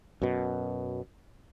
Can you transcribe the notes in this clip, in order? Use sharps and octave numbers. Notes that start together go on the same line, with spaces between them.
F#2 B2